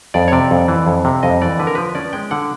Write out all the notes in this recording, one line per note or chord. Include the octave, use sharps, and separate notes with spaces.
F2 D5
C#5
C3 D5
F2
E3
F2
C3
F2 D#5
E3 D5
D3 B4
A#4
F3 B4
C#4 D5
G#3 G5
D3 F#5